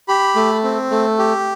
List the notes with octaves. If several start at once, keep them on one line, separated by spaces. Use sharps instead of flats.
G4 B5
A3
C4
A3
G4